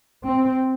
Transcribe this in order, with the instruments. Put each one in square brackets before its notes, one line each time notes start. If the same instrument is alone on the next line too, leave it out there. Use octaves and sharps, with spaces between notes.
[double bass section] C4